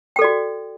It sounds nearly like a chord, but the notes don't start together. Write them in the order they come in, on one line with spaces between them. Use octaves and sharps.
G5 A4 D5 F#4